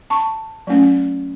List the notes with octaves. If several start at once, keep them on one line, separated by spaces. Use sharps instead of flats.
A5 C#6
F#3 A3 C#4